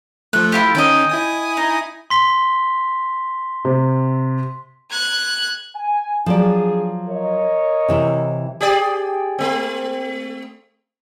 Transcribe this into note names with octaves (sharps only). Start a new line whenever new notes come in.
F3 A3 F#6
E4 F4 G4
D#3 C#4 D#5 G5
E4 G#5 D#6
D#4
C6 B6 G7
C3
F#6 G#6
G#5
F3 F#3 D4 G#4 D5
A#4 C#5 D#5
C3 E3 E4
G4 G#4 D5
A3 C4